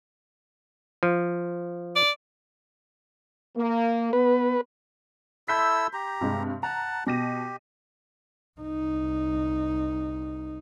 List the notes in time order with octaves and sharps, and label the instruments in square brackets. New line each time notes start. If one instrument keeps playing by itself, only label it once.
[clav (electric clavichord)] F3
[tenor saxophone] D5
[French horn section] A#3
[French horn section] B3 [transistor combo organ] B4
[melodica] E4 A4 E6 [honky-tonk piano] C6 G6 B6
[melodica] G4 A#5
[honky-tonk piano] G2 C3 G#3
[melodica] F#5 A5 [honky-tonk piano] A#5
[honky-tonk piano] B2 A#6 D#7 [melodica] G4
[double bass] C2 D#4